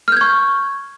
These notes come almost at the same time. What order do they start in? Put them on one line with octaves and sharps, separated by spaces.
F6 G6 G#6 C#6